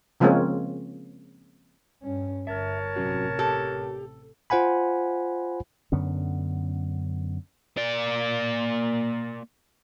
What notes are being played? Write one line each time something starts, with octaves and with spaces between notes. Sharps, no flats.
C#3 F3 G#3 A#3 C4 C#4
G2 C#4
G1 A#4 C#5 E5 A5
A1 C3 F#3 C#4 F#4
G4 A4
F4 C5 F#5 G#5 B5
F#2 D3 B3 C#4
A#3 D5